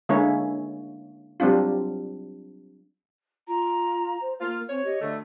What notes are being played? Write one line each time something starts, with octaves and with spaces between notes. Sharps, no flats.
D3 G#3 A#3 C#4 E4 C#5
F#3 G3 C4 D4 F4
F4 A#5
C5
A#3 F4
C4 C5 C#5
G4 D#5
D2 D3 A3